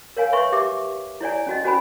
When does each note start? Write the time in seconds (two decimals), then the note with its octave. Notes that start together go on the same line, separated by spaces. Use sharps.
0.17 A#4 C#5 F5 G#5
0.33 B4 C#5 E5 C6 C#6
0.52 G4 E5 D6
1.21 E4 C#5 D5 G#5
1.47 C#4 F#4 D#5
1.64 C#4 F#4 C5 G#5 B5